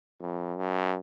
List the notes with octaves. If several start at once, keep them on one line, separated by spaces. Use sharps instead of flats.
F2
F#2